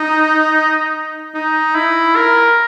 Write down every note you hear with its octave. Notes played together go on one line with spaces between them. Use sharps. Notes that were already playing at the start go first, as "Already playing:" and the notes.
Already playing: D#4
D#4
E4
A#4